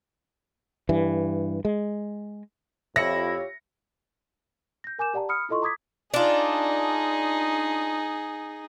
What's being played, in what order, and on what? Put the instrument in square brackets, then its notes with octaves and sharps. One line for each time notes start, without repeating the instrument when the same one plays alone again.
[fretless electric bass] G2 E3
G#3
[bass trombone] F2 [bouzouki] E4 [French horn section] F4 G4 C#5 [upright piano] A#6 C#7
[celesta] G6 A#6
A#4 G#5 D6 G6 E7
G4 D5 F#5 A5 A#5
B5 D#6 F6 C#7
E4 F4 A4 D#5 C6 C#6
A#5 D6 D#6 G#6 B6
[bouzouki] D4 F4 [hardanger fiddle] D#4 G#4